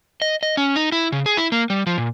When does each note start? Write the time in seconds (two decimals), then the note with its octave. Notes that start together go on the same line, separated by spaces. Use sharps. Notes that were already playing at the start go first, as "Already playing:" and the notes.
0.22 D#5
0.43 D#5
0.57 C#4
0.76 D#4
0.92 E4
1.12 C#3
1.26 G#4
1.37 E4
1.52 A#3
1.70 G3
1.87 F3
1.98 A#2